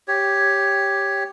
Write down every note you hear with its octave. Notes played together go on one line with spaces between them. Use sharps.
G4 C#5